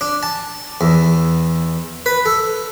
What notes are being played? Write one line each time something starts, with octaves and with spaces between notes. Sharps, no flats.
D4
A5
E2
B4
A4